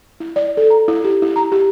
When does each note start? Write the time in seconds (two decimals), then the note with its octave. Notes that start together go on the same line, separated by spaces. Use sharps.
0.20 E4
0.36 D5
0.57 A4
0.70 A#5
0.88 E4
1.04 G4
1.22 E4
1.36 A#5
1.52 G4